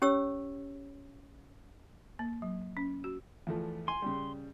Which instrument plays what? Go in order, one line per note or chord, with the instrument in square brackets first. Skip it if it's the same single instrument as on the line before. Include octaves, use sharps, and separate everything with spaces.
[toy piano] C#4 G4 C#5 E6
[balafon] A#3
F#3
C#4
F#4
[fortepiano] E2 F3 A3
[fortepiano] G#5 [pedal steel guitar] C6
[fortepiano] C#3 G3